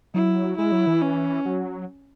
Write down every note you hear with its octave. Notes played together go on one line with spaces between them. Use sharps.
F#3 E4
G#3 E4
F#3
E3
C#4
F#3